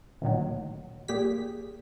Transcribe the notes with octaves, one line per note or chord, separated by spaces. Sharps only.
D2 A#2 D#3 F#3
A#2 G4 G#4 B6